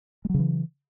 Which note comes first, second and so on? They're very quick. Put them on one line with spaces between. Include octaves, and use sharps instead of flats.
G#3 F#3 C#3 E3